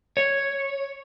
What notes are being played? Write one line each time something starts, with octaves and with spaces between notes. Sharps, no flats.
C#5